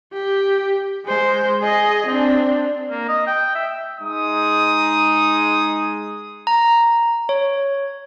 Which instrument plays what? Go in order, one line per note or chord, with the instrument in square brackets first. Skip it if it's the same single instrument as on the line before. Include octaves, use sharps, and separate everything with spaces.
[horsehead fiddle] G4
G#3 C5
G#4 D#5
C4 D4
[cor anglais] A#3
D#5
G5
E5
[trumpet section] G#3 D#4 D#6
[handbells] A#5
C#5